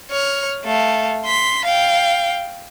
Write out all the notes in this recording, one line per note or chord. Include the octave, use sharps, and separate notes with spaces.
C#5 F6
A3 F5
C6 B6
F5 G5